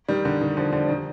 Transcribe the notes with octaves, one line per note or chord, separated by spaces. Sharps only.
D#3 G3
D3
D#3
D3 F3
D3
F3
D#3